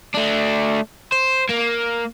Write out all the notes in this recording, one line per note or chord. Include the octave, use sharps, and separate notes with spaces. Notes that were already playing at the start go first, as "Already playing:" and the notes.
A3 D4
C5
A#3